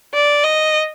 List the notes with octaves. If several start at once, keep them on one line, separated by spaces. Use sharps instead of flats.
D5
D#5